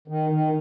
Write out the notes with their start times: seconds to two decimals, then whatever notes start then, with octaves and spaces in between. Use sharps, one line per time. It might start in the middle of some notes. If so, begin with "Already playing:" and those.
0.08 D#3
0.30 D#3